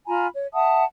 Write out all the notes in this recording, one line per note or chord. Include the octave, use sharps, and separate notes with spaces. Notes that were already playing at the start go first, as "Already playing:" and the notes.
F4 G#5 A#5 B5
C#5
E5 F#5 A5 D#6